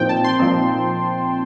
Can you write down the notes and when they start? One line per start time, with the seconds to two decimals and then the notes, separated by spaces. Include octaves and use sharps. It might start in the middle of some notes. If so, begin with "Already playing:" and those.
Already playing: A#2 F3 C4 D#4 G5
0.09 A5
0.24 C6
0.39 A#2 F3 C4 D#4